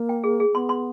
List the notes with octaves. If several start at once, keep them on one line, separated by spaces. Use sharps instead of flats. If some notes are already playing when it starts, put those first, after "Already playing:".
Already playing: A#3
G5
G#4
G#4
B3 C6
C6